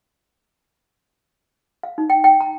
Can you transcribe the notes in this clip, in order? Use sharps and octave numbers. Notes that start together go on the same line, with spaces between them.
F5
D#4
G5
G5
A#5